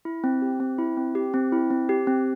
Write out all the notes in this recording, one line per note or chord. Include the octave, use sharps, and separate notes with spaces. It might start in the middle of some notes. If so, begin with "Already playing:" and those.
E4
C4
G4
C4
E4
C4
G4
C4
E4
C4
G4
C4